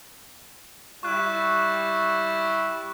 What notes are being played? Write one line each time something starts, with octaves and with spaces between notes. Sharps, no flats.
G3 E4 C#6 F#6